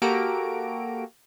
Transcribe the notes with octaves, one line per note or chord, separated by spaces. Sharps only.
A#3 F#4 G4 A4 A#5 D7